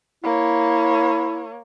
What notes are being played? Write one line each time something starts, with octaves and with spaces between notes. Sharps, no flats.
A#3 E4 C#5